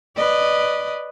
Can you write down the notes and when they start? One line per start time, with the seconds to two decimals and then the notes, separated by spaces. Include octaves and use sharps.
0.17 B4 D5 D#5